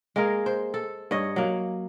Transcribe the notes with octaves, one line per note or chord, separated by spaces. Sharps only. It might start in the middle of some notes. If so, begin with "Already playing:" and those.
G#3 A#3 G#4 A#4
C5
A4
G2 C#5 D#5
F#3 A#3